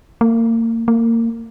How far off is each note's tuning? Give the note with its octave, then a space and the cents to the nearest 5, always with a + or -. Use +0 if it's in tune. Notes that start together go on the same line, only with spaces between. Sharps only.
A#3 -35
A#3 -25